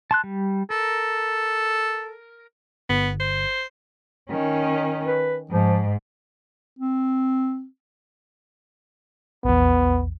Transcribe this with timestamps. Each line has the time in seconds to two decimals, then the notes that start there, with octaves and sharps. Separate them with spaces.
0.11 A5 C6 F#6
0.24 G3
0.70 A4 A#4
2.90 G1 B3
3.20 C5
4.31 D#3 C#4
5.06 B4
5.51 G#2 F3
6.79 C4
9.45 A#1 E2 B3